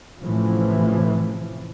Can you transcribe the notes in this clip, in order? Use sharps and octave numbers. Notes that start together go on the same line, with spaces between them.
A1 A2 C3 E3 F3